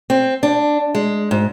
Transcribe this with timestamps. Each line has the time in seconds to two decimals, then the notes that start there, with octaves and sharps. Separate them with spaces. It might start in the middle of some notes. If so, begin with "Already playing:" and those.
0.10 C4
0.43 D4
0.95 G#3
1.31 G#2